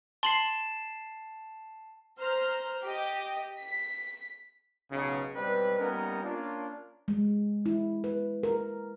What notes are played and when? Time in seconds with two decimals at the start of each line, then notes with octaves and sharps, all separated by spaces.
0.23 A5 C6 C7 F#7
2.19 C5 A#5 F6
2.83 G4 D#5
3.58 B6
4.91 B1 C#3
5.34 B1 G#2 G3 C4 B4
5.79 G3 A#3 B3 C#4 D#4 A#4
6.24 A#3 C#4 D4 F4
7.08 G#3
7.66 E4
8.04 B4
8.43 A#4